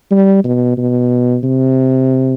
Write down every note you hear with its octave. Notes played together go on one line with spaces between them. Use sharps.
G3
B2
B2
C3